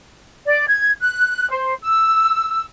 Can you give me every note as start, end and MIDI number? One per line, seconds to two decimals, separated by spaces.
0.46 0.65 74
0.67 0.90 92
1.01 1.48 90
1.50 1.74 72
1.81 2.64 88